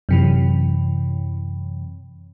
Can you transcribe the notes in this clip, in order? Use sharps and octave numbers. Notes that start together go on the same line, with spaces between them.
F#2 C3 E3